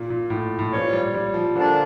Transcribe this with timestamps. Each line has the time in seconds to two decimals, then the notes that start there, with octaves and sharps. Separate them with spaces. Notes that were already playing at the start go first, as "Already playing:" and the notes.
Already playing: A#2
0.10 A#2
0.30 A2
0.59 A2
0.72 G2 A#2 F3 C#4 F4 C#5
0.93 G3
1.14 G3
1.34 F3
1.55 A#2 D3 F3 A#3 D4